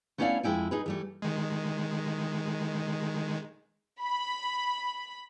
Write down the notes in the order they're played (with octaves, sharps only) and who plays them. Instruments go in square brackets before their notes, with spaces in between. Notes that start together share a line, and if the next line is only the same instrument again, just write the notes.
[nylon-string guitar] A3 B3 C#4 E4 D5 F5
F2 G#3 E4 G5 G#5
D#4 G#4 B4
E3 G3 A3
[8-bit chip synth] D#3 G#3
[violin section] B5